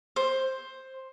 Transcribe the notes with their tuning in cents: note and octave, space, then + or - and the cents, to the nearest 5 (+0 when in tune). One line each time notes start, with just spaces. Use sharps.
C5 +10